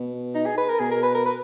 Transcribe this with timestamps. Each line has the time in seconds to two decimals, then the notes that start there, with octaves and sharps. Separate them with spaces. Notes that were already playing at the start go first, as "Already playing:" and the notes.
Already playing: B2
0.35 D#4
0.46 G#4
0.58 B4
0.69 A#4
0.80 B2 G#4
0.91 A#4
1.03 B4
1.15 A#4
1.26 B4